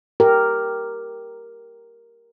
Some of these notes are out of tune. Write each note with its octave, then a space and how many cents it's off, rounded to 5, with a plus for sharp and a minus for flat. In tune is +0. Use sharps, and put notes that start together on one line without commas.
G4 +0 A#4 +0